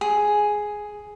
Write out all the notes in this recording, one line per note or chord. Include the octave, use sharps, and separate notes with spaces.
G#4